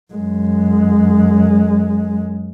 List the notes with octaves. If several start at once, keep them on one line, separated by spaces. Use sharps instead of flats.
F#2 G#3